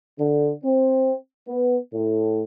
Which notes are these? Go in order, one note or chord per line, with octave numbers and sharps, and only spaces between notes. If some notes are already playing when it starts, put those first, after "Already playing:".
D3
C4
B3
A2